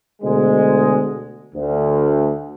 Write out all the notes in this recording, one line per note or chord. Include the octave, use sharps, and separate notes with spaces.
D2 B2 G#3
D2